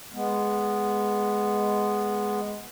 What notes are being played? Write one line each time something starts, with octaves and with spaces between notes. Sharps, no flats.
G#3 B3